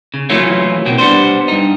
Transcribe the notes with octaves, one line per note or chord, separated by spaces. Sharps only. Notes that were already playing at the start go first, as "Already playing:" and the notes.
C#3
E3 F#3 A3 A#3 C#4 F4
B2 A#3 C4
G3 B3 D4 C5
G2 D#4